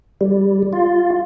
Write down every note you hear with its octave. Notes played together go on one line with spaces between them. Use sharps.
G3
F4